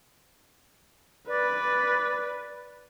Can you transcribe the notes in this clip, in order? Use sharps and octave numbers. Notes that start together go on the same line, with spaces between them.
B4 D5